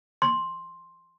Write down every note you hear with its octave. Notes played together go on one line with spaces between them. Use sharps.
C6